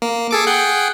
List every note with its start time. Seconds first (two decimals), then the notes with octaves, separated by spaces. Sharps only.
0.02 A#3
0.31 G#4 A4 D6
0.47 G#4 F#5 G5